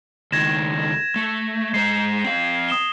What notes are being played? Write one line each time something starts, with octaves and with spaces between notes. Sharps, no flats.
C#2 D#3 G#6 A#6 E7
A3
G#3 C5 C7
C4 F5
D#6 E7 G7